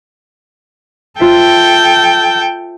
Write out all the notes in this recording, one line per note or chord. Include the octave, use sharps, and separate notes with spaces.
F4 A4 C5 E5 G5